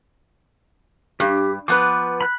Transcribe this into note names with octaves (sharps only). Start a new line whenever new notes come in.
G2 G4
F3 B3 B4 D6
B5 F#6